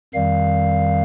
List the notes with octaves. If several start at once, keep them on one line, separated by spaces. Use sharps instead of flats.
F2 D#3 G3 F5